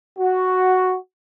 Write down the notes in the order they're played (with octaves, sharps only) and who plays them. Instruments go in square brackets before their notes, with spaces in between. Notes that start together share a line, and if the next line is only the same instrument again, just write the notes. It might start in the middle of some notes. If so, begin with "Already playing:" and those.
[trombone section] F#4